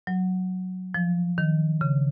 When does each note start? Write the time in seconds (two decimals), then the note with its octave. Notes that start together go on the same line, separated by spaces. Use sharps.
0.07 F#3
0.94 F3
1.38 D#3
1.81 C#3